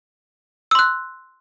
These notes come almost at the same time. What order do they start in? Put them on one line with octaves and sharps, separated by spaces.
E6 C6 F#6